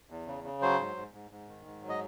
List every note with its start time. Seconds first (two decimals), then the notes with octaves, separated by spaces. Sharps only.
0.10 E2
0.27 C#3
0.44 C#3
0.62 F#3 C5
0.80 G#2
0.96 G#2
1.13 G#2
1.31 G#2
1.49 D#3
1.66 G#2
1.82 F#3
1.89 D#5